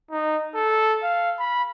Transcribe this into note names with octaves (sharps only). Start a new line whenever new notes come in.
D#4
A4
F5
B5